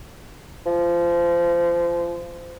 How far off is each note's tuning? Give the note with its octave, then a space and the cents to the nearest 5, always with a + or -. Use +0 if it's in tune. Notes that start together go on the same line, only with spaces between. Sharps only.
F3 -25